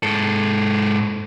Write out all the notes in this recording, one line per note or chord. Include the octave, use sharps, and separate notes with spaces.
G#2 A4